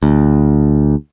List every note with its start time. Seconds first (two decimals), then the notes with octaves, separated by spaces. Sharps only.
0.03 D2